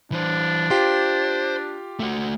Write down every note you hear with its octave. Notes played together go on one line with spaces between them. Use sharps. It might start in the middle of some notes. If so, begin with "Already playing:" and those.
E3 D4 C5
F4 G4 C5
A3 F#4